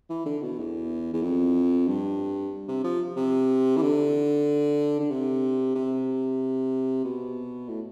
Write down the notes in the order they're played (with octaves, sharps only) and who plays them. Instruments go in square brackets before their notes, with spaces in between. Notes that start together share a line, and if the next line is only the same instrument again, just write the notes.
[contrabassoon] E3
D3
B2
E2
E2
F2
G2
C3
F3
C3
E3
D3
D3
C3
C3
B2
A2